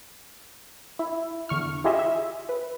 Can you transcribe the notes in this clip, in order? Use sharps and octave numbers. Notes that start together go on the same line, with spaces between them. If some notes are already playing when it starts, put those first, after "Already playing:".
E4
E2 D3 C#6 F6
E4 F4 G4 G#4 D#5 E5
E5
B4